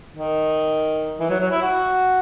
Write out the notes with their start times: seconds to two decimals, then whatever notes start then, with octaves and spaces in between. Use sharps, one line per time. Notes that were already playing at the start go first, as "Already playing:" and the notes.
0.15 D#3
1.20 E3
1.30 F#3
1.40 F#3
1.51 E4
1.62 F#4